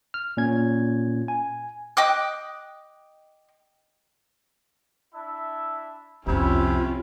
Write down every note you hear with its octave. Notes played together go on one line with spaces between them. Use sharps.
F6
A#2 C#4 G#6
G#5
D#5 G5 D6 F#6
D4 E4 E5
C2 F2 C3 C#4 E4 F4